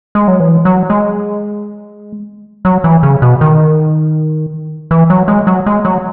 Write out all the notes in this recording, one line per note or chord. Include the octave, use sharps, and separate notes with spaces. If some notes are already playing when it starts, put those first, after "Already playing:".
G#3
F#3
E3
F#3
G#3
F#3
E3
C#3
B2
D#3
E3
F#3
G#3
F#3
G#3
F#3